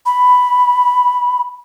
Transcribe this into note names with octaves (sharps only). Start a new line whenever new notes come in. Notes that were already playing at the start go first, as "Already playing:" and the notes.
B5